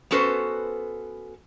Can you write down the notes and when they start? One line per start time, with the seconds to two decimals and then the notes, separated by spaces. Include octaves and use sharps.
0.11 B3 C#4 F#4 A4 B4 C5